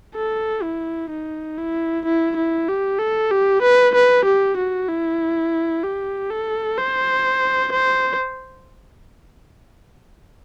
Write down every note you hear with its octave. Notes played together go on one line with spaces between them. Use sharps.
A4
E4
D#4
E4
E4
E4
G4
A4
G4
B4
B4
G4
F#4
E4
G4
A4
C5
C5